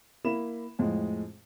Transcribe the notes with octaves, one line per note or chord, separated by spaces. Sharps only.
A#3 E4 B5 E7
F2 A2 G#3